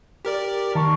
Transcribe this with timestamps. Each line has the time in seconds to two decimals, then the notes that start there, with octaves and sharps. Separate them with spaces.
0.25 G4 A#4 D5
0.75 D#3 A5 A#5 C#6